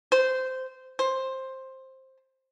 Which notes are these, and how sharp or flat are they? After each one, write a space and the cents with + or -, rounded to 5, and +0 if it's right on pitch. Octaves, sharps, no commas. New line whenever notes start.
C5 -15
C5 +10